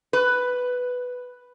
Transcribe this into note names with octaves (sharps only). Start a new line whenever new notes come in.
B4